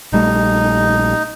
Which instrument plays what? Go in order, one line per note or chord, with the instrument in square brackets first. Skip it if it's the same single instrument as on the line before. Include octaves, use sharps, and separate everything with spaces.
[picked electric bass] A#1 G3 A3 [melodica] D#4